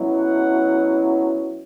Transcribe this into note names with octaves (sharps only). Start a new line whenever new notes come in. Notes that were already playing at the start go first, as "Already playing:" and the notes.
Already playing: B2 F#3 C#4 E4
F#5